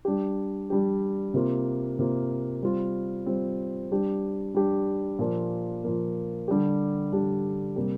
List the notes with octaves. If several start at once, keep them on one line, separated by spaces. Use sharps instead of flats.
G3 D4 G4
G3 D4 G4
C3 A#3 F4
C3 A#3 F4
G3 C4 F4
G3 C4 F4
G3 D4 G4
G3 D4 G4
A#2 F3 A#3
A#2 F3 A#3
D3 G3 D4 G4
D3 G3 D4 G4
C3 G3 A#3 G4